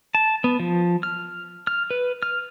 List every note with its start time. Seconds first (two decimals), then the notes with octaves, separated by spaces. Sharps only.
0.15 A5
0.44 B3
0.60 F3
1.03 F6
1.67 F6
1.90 B4
2.23 F6